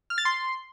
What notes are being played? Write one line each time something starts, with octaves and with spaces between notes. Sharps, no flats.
F6
A6
C6